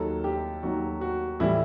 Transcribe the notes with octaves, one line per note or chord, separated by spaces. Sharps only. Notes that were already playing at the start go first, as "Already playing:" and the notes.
Already playing: D#2 D#3 F#3 A4
G4
D#2 D#3 F#3 F#4
F#4
A2 E3 G3 E4